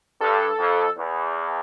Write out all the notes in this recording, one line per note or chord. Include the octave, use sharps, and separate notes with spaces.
G2 A4
F2
E2